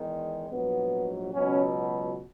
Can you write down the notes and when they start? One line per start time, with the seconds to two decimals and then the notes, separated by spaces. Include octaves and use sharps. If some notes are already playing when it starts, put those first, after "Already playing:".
Already playing: E2 D#3 G#3
0.49 A#1 G#2 F#3 B3
1.32 C#2 B2 F#3 C#4